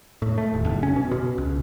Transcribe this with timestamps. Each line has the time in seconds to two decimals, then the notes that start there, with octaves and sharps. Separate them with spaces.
0.22 A2
0.38 A3
0.54 D#1
0.66 F#1
0.83 C#4
0.96 B2
1.11 B2
1.38 C#2